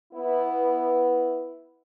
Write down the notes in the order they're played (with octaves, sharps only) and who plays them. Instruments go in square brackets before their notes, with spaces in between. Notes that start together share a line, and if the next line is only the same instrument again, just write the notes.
[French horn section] B3 E4